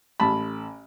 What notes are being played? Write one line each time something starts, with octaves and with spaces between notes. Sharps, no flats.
A1 A5 B5